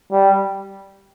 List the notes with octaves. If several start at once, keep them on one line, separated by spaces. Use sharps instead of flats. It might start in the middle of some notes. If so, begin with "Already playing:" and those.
G3